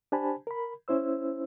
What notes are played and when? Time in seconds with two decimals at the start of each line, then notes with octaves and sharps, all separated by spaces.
0.12 D4 G4 C5 G#5 A5 B5
0.47 A#4 B5
0.88 C#4 E4 C5 E6